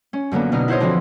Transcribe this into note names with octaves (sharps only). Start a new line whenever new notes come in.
C#4
F#2 D3 A#3 B3
B2 D3 D#4 F6
E4 F#4 C5 C#5 D#5
D3 E3 F3 C4